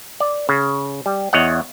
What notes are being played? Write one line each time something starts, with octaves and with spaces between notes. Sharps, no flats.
D5
C#3
G3
E2 C#5 D#5 F#5